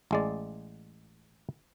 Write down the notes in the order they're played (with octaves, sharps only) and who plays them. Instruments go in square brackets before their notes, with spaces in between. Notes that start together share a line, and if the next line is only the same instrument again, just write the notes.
[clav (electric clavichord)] A1 G#3 D5